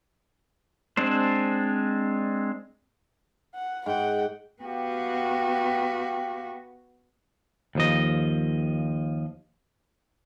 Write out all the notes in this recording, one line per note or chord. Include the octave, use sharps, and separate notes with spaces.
G#3 C4 D4 C5
F#5
G#2 F#5 G5
B3 F#4 G4 F5 G5
D#2 F3 D#5